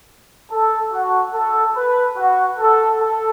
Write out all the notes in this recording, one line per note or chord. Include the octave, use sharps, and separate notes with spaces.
A4
F#4
A4
B4
F#4
A4
A4